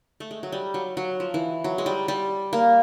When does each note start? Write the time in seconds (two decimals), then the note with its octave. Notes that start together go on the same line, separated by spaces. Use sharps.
0.20 A3
0.31 G#3
0.43 F#3
0.52 G3
0.74 F#3
0.97 F#3
1.20 F3
1.34 E3
1.64 F#3
1.78 G#3
1.86 G3
2.08 G3
2.53 A#3